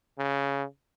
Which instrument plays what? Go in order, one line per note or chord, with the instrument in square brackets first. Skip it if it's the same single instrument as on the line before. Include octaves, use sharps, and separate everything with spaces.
[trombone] C#3